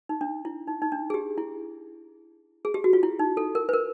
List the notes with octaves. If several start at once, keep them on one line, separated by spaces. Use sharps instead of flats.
D#4
D4
E4
D#4
D#4
D4
G#4
G4
E4
G#4
G4
F#4
F4
E4
D#4
A4
A#4
B4
A#4